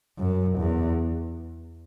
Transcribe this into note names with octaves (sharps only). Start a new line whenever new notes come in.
F#2
E2